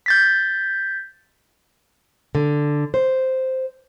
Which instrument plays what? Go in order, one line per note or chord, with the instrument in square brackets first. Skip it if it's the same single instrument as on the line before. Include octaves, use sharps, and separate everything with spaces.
[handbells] G6 A6 B6
[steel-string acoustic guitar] D3
C5